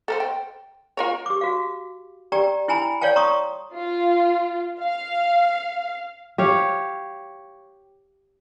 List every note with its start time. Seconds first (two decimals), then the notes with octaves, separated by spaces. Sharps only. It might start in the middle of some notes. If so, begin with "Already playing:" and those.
0.08 A4 A#4 C5
0.20 G5
0.97 F4 A#4 C#5
1.26 G4 D6
1.41 F#4 F5
2.32 G4 D5 G5 A#5
2.68 E4 G5 G#5 A#5 B5
3.01 C#5 D5 F5 G5 A5
3.16 A#5 C6 C#6 D#6
3.74 F4
4.80 F5
6.38 G4 C#5 F5